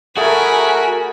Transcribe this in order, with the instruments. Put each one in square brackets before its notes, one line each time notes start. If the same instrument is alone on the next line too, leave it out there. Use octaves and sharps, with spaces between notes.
[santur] A3 G#4 [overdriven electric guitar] F#4 [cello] A#4 [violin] G#5 B5